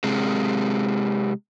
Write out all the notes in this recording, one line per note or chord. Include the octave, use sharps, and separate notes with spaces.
C3 G#3